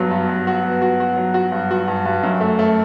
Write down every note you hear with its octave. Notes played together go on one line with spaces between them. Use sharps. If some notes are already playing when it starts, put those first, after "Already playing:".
Already playing: G2 F#3 B3 F#4
G2
G2
F#4
B3
F#4
F#4
F#3
F#4
G2
F#4
G2
G2
F#2
A3
A3